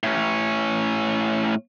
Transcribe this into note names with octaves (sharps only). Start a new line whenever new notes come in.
A2 C#4